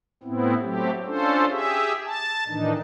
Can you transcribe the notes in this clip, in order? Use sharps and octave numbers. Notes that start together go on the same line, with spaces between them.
A2 B3 C4 E4
F#3 A3 C4 G4
C#4 D4 F4 A4 C5
G4 G#4 E5
A5
A2 D#3 E3 D4 D#4